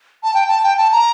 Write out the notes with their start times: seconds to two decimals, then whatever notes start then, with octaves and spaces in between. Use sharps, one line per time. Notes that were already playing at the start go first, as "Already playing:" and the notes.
0.23 A5
0.34 G5
0.48 A5
0.64 G5
0.78 A5
0.92 A#5